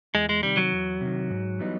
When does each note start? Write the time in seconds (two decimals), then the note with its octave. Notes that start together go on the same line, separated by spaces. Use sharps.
0.14 E2 G#3
0.29 G#3
0.43 C3 D#3 G3
0.57 F#3
0.72 E2
1.01 C3 D#3
1.30 G#2
1.59 E3 G3 B3 D#4